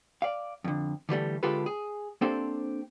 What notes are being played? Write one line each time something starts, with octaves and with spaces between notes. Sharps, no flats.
D5 F5
F2 D3
D3 E3 G3 A3
D3 G#3 F4 G4 A4 B4
G#4
A#3 C4 D4 G4 A4 C5